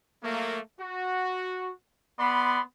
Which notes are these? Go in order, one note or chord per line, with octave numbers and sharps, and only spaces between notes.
F#3 A3 A#3
F#4
B3 D5 B5 C6